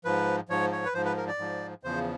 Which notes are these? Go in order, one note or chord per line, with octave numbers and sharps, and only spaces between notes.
G#2 F3 B4
G#2 F3 C#5
C#5
B4
G#2 F3 C5
B4
A#4
D5
G#2 F3
E2 C#3 F3 C5